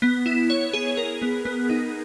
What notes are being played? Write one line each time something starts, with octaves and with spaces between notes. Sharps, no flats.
B3
E4
C#5
G#4
A#4
B3
B3
D#4